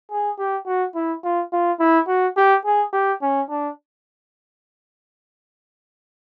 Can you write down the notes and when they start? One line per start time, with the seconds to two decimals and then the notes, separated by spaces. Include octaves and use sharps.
0.11 G#4
0.38 G4
0.66 F#4
0.95 E4
1.24 F4
1.52 F4
1.80 E4
2.08 F#4
2.37 G4
2.65 G#4
2.93 G4
3.22 C#4
3.50 D4